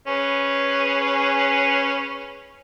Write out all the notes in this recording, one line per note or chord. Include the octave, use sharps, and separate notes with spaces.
C#4 G#4 B4